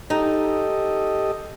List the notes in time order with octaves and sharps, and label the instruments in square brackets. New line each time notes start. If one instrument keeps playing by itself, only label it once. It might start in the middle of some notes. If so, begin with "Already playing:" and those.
[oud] D#4 [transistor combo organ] G4 A4 D#5